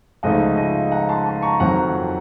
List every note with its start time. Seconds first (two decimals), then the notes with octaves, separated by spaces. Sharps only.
0.23 C#2 C#3 F3 A3 D#4 D#5 F#5
0.57 D#5
0.92 F#5 A#5
1.09 A5 C6
1.26 A5 C6
1.42 A#5 C#6
1.60 F2 D#3 F#3 C4 F#5 A#5